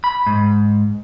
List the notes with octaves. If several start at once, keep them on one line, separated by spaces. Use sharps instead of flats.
B5
G#2